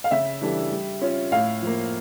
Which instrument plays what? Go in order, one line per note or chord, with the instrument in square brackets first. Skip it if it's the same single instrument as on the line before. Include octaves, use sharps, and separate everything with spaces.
[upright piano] F5
[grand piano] C#3 [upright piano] E5
[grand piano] E3 G3 D4 A4
G3
C#4 F4 C#5 E5
[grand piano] A2 [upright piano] F5
[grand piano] F3 A#3